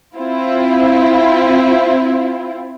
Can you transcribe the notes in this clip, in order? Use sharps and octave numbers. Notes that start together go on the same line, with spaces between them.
C4 E4 F4